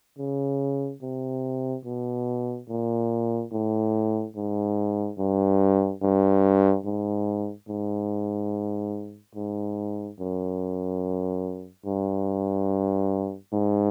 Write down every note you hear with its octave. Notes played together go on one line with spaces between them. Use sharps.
C#3
C3
B2
A#2
A2
G#2
G2
G2
G#2
G#2
G#2
F#2
G2
G#2